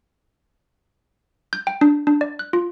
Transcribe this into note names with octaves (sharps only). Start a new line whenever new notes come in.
G6
G5
D4
D4
D5
F#6
F4